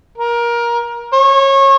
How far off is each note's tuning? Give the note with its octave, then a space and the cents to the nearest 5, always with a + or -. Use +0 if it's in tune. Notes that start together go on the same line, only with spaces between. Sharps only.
A#4 +20
C#5 -25